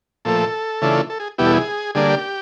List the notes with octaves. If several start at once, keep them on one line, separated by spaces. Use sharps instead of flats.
A#2 F3 A3 A4
C#3 E3 A3 D4 F4
A4
G#4
E2 B2 G3 B3 E4 G4
A4
G#4
D3 G3 A#3 D4 G#4
G4